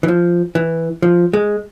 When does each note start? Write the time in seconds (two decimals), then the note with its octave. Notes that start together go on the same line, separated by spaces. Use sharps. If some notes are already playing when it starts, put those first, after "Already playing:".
0.03 E3
0.08 F3
0.55 E3
1.02 F3
1.33 G#3